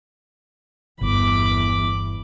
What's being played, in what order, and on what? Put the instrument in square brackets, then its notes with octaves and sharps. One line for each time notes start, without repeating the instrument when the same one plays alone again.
[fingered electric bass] G1 [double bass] E2 [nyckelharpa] B5 D6